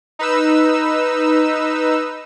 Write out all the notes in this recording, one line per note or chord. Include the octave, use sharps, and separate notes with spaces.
D#4 B4 E6